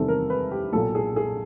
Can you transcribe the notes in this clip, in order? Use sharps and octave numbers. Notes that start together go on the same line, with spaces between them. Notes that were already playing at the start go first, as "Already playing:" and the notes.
Already playing: E2 C3 D#3 G3 C4 A4
A#4
B4
G4
B1 A#2 F#3 A#3 A4
G#4
G#4